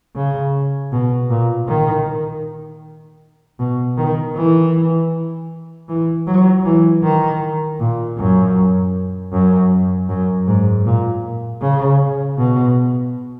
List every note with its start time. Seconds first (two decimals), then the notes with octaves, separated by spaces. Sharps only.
0.16 C#3
0.92 B2
1.30 A#2
1.68 D#3
3.59 B2
3.98 D#3
4.36 E3
5.89 E3
6.27 F#3
6.65 E3
7.03 D#3
7.80 A#2
8.18 F#2
9.32 F#2
10.09 F#2
10.47 G#2
10.85 A#2
11.61 C#3
12.38 B2